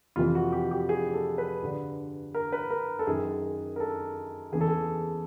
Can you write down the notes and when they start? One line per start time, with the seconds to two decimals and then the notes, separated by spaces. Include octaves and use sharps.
0.16 F2 C3 E3 F4
0.35 F#4
0.52 G4
0.71 G4
0.89 G#4
1.14 A4
1.38 B4
1.62 G2 D3
2.34 A#4
2.52 B4
2.70 A#4
2.99 A4
3.07 F#2 D#3 G#4
3.76 A#4
3.80 A4
4.52 E2 C#3 E3 G#4
4.61 A4
4.69 G#4